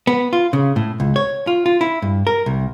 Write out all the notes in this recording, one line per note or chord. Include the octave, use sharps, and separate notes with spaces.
B3
F4
C#3
A2
C#2
C#5
F4
F4
E4
G2
A#4
C2